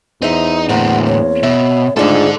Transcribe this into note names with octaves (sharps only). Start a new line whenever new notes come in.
E2 D#4 C5 E5
A2 D3 A#3 C4 F#5
C#5
B2 E5
G#2 A3 D4 F4 G#4 A4 D5